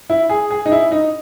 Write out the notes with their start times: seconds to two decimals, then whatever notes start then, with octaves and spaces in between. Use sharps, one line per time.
0.10 E4
0.30 G#4
0.51 G#4
0.66 D#4
0.72 E4
0.91 D#4